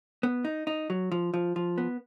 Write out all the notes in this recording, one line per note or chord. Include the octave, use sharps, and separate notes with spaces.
B3
D#4
D#4
F#3
F3
F3
F3
B3